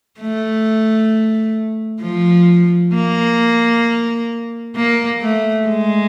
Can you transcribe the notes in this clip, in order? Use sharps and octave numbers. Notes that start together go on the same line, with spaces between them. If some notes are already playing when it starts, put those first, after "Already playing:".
A3
F3
A#3
A#3
A3
G#3